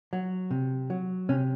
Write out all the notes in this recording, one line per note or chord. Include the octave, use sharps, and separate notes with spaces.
F#3
C3
F#3
C3 C#4